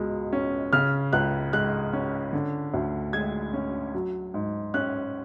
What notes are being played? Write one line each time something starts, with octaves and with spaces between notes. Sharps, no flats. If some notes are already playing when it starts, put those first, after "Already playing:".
Already playing: C#2 B2 G#3
C#4
C#3 F6
C#2 F#6
G#3 F#6
C#4
D3
D2
G#3 G#6
C#4
F#3
G#2
C#4 F#6